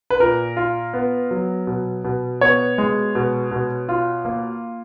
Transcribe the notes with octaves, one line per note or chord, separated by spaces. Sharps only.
B4
A#2 A#4
F4
B3
F#3
B2
B2
B3 C#5
G#3
B2
B2
F4
A#3